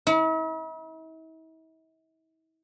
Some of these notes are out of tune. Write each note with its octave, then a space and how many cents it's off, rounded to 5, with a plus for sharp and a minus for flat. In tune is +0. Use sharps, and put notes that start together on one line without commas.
E4 -45